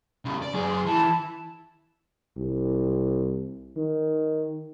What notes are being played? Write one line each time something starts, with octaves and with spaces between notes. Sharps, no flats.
E2 C#3
D5
F#2 G#4
C6
E3 E4 A5
C2
D#3